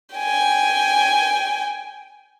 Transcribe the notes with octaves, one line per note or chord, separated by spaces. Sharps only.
G5 G#5